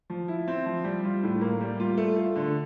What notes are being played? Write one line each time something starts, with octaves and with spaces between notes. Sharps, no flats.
F3
E4
C4
F3
G3
F4
A2
A#3
G3
F4
A3
F4
D3